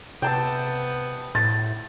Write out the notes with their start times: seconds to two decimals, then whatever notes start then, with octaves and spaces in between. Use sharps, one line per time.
0.22 C3 B3 G5 A5 E6
1.35 A2 A6